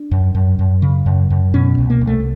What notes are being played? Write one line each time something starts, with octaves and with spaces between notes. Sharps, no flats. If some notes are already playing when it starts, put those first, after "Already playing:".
Already playing: D4
F#2
F#2
F#2
C#3
F#2
F#2
B2 C#4
C2
A#3
C2
A3